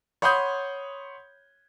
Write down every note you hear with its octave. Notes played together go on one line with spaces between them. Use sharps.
C#5 F#5 B5 C6 D#6 G6